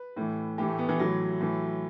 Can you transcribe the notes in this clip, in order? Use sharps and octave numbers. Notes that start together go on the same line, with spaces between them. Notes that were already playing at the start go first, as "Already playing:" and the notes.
Already playing: B4
A2 E3
A2 E3 G4
A3
B3
E3
A2 E3 F#3
A2 E3